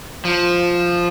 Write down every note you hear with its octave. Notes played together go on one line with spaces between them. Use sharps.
F3